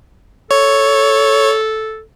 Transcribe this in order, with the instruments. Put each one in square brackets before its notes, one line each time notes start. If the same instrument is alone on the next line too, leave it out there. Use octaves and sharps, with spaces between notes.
[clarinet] A4 [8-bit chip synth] C#5